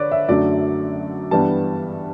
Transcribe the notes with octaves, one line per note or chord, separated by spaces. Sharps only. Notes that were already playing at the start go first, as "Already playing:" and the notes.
Already playing: D3 B4 C#5 D5
E5
F#2 D3 F#3 A3 D5
G2 E3 G3 B3 A5